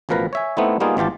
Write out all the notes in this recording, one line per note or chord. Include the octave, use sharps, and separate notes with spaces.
A1 B2 F3 A#4 B4 A#5
C#5 E5 G#5
A3 B3 C4 D#4 E4
G3 A#3 B3 D#4 F4 G#4
G#1 E3 F4 G4 A5